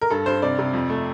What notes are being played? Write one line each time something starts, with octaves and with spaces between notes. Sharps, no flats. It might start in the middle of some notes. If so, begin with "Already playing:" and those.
A#4
G2 A4
G2 C5
C3 D5
C3
F2
A3